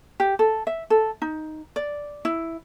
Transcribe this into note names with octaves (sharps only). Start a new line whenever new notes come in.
G4
A4
E5
A4
D#4
D5
E4